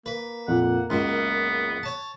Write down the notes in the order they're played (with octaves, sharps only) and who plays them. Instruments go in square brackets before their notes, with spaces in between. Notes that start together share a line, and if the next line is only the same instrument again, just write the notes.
[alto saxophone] A#3 [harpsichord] B4
[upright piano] F2 A#2 [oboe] F#5
[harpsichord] C#2 F#2 [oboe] B3 [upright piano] C6
[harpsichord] C#5 A5